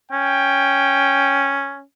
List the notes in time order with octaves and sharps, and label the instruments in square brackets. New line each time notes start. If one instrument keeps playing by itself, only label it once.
[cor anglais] C#4 [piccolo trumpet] G5